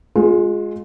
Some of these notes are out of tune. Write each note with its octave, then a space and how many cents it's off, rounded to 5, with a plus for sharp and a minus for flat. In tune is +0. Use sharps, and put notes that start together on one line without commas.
G#3 +0 F4 +25